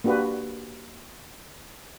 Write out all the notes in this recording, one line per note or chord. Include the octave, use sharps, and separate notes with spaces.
A#3 D4 F#4 G4 B4